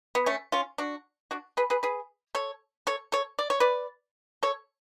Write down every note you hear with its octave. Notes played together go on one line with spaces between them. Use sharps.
B3
A3 C#4
C#4 F4
D4 F#4
D4 F#4
G#4 B4
G#4 B4
G#4 B4
A4 C#5
A4 C#5
A4 C#5
D5
C#5
B4 D5
A4 C#5